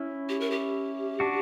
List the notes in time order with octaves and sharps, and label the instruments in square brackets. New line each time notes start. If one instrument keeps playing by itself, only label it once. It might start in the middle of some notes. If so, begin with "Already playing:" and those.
Already playing: [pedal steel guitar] C#4 E4
[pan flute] G4
A#4
G4
[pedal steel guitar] D4 F#4